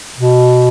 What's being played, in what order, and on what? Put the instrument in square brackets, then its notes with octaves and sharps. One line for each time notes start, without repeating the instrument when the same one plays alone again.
[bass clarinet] B2